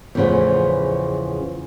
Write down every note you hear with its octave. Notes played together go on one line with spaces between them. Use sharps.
E2 A2 C#3 F3 B3